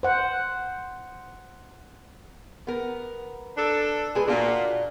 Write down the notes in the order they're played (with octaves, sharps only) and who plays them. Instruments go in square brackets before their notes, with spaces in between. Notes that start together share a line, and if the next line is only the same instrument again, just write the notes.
[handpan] C5 F#5
[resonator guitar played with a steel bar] B3 A#4
[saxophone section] D4 A4
[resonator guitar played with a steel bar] G#3 G#4 B4
[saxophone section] A#2 [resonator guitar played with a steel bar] D4 F4 F#4